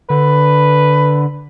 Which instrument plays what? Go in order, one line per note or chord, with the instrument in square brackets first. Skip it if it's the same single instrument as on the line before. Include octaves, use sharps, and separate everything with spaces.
[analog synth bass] D3 [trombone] B4